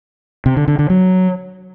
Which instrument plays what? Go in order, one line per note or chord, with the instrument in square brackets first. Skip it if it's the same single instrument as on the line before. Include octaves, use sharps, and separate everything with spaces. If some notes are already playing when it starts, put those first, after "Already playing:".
[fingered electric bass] C3
D3
D3
D3
F#3